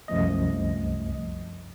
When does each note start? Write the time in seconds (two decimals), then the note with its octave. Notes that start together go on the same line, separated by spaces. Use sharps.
0.08 C2 F#2 F3 A3 D#5